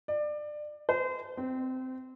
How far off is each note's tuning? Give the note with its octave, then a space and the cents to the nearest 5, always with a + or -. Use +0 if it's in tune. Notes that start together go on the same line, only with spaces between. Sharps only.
D5 +25
C5 -35
C4 -15